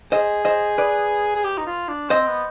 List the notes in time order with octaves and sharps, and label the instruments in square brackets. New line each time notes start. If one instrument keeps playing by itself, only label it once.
[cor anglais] G#4 [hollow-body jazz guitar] C5 D#5
[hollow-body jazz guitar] C5 D#5
B4 D5
[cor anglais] G#4
G4
D#4
F4
D4
[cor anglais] C4 [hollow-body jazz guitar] C5 D#5
[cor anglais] B3